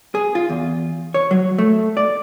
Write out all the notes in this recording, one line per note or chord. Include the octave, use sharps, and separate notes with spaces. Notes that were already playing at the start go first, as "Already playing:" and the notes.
G#4
F4
E2
C#5
F#3
A3
D5